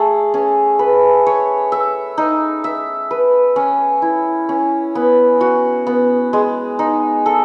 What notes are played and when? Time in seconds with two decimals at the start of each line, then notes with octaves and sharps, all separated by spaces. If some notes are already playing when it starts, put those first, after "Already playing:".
Already playing: A3 G#4
0.34 C#4
0.79 B4
1.26 C#5
1.72 E5
2.18 D#4
2.64 E5
3.11 B4
3.56 C#4
4.02 E4
4.49 C#4
4.95 B3
5.41 F#4
5.87 B3
6.33 G#3
6.79 D#4
7.26 A4